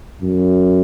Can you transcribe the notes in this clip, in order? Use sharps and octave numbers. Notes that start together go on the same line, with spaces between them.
F#2